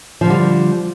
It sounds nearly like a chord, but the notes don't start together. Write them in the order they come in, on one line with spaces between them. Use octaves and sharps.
F3 D3 G3